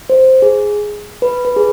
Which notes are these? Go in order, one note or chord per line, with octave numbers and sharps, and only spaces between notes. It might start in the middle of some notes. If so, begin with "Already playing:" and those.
C5
G#4
B4
B4
G#4